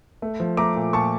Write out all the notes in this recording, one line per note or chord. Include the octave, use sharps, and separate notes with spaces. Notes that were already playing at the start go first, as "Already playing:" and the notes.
A3
F3
A3 A#5 D6
A#2
A#2 A5 C#6